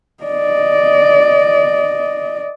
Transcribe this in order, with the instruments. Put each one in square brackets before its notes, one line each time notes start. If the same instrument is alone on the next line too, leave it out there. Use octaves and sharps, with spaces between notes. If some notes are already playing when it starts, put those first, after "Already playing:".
[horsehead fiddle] D5 D#5